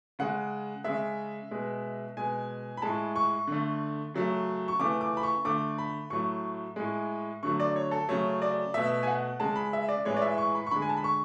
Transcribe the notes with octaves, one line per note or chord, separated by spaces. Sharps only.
C#3 G#3 F#5
C#3 G#3 E5
B2 G#3
B2 G#3 G#5
B5
A2 G#3 A5
C#6
D3 A3
C#3 F#3 A3
C#6
C#3 E3 A3 D6
D6
B5
C#6
D3 A3 D6
B5
A2 F#3 A3 C#6
A2 G#3
D3 F#3 A3 C#6
D5
C#5
A4
C#3 F#3 A3 C#5
D5
B2 A3 E5
G#5
F#5
C#3 G#3 A5
B5
E5
D5
A2 E3 G#3 C#5
D5
E5
C#6
B5
C#6
D3 G#3 B5
G#5
A5
B5
C#6